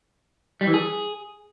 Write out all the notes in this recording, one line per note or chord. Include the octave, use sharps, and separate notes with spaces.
G3
E3
G#4